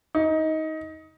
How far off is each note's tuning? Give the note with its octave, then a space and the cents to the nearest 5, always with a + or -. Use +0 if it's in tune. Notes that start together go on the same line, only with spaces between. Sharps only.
D#4 +20